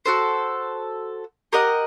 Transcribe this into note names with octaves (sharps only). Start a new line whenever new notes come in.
F#4 A4 C5
G4 A#4 D#5 F#5